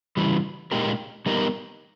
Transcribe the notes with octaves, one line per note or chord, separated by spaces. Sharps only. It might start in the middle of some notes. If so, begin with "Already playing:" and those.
C#3 E3 G3
A#2 G#3 D#4 G4 A#4
G3 B3 D#4 G4 A#4